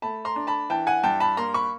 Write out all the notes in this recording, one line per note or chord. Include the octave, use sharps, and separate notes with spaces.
A3 A5 B5
A#5 C6
D4
A5 B5
E3 G5 A5
F#5 G#5
G2 G5 A5
A5 B5
A#3 A#5 C6
B5 C#6